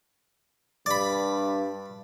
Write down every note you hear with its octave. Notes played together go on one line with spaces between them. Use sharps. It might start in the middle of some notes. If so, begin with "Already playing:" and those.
G2 D5 B5